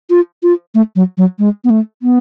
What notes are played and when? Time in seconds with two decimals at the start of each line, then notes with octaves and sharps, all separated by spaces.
0.10 F4
0.43 F4
0.75 A3
0.96 F#3
1.18 F#3
1.39 G#3
1.64 B3
1.70 A3
2.02 B3